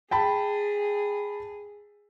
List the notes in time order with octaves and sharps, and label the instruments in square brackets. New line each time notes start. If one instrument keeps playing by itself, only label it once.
[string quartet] G#4 [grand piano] G5 A5 B5